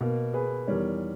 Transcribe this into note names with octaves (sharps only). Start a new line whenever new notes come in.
B2 A#3
G#4 B4
E2 D#3 G3 A#4 C#5